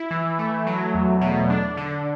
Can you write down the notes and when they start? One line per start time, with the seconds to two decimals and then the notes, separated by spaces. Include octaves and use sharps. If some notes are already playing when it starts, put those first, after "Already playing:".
Already playing: E4
0.11 E3
0.39 A3
0.67 F#3
0.94 E2
1.21 B2
1.50 D4
1.77 D3